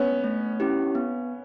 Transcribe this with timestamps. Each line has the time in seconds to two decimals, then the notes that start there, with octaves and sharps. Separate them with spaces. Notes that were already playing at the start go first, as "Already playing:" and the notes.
Already playing: B3 C#4
0.24 A3
0.60 C#4 E4 G4
0.95 B3